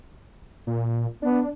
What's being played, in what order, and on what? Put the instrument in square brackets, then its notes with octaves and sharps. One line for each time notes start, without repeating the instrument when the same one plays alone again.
[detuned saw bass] A#2
[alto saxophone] B3 [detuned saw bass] D4